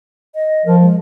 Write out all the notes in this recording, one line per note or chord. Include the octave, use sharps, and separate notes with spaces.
D#5
F3 A#4
G#3